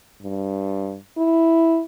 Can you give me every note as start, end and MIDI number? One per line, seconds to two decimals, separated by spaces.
0.22 0.97 43
1.18 1.82 64